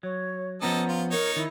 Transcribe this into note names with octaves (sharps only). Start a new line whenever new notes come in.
F#3 C#5
F3 B3 C#4 A4 D#5 A#5
F4
D#4 A#4 C#5
D#3 E4